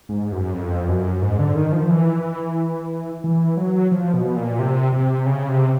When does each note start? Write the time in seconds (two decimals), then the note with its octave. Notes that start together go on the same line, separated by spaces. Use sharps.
0.09 G#2
0.32 F#2
0.54 F2
0.89 F#2
1.22 G#2
1.39 D3
1.55 D#3
1.72 F3
1.89 E3
3.24 E3
3.57 F#3
3.92 F3
4.14 B2
4.36 A#2
4.59 C3
4.93 C3
5.26 C#3
5.49 C3